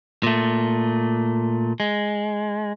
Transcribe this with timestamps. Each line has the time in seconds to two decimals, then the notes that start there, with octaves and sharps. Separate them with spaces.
0.23 A#2 A3
1.80 G#3